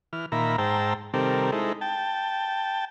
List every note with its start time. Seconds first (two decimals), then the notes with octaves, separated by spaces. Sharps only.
0.13 E3 F6
0.32 A#2 D#3 E5 A#5 B5
0.58 G#2 C5 G5 A5 A#5 E6
1.14 C3 D#3 G3 C4 A4 A#4
1.52 G#3 D#4 E4 A4 C5
1.81 G5 A5